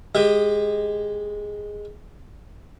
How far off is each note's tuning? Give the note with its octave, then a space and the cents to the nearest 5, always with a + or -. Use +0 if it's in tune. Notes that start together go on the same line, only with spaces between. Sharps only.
G#3 +0 G4 +20 D#5 +0